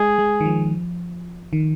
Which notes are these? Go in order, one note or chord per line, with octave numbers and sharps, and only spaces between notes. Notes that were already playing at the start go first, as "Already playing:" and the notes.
Already playing: G#3 G#4
G#3
D#3
F3
D#3